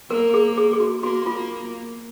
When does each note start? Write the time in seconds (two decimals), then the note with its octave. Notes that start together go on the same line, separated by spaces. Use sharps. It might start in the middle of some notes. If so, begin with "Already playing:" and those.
0.10 A#3 A#4
0.34 G#4
0.57 G#4
0.73 G#4
0.80 F#4
1.03 A#3 F#4
1.26 F4